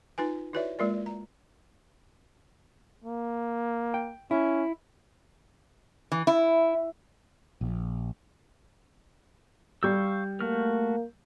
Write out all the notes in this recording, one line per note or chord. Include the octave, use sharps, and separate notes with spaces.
D#4 F4 B4 G#5
E4 F#4 B4 C#5 D5 E5
G#3 A#3 F4 A#4 D5
A#5
A#3
G5
C#4 E4
E3
E4
A#1
G3 F5 C#6 E6 G6
A3 A#3 F#4 F6